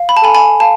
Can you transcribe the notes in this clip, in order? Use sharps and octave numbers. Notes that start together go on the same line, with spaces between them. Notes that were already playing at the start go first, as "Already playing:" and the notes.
Already playing: F5
B5
A5
A4 G#5 B5
G#5 B5
F5 A5